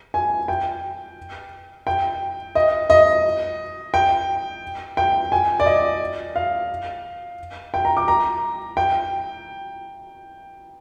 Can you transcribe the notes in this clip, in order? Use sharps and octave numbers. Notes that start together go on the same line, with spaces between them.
G#5
G5
G5
D#5
D#5
G5
G5
G#5
D5
D#5
F5
G5
A#5
D6
A#5
G5